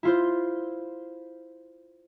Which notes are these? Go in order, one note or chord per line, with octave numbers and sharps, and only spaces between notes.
E4 F4 C5